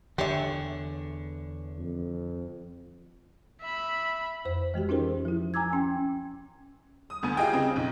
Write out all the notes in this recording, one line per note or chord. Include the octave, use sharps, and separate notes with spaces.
E2 D3 G4 C#5 E5 G#5
F2
E5 B5
F2 C5
E3 G#3 F#4 G4
C#4 D#4 F4 G#4 A#4 C5
F3 E4
G#5 A#5 D6 E6 G#6
C#4 G5
D#6
D2 B3 G#5
F4 G4 G#4 D#5 G5
C#3 C4
B1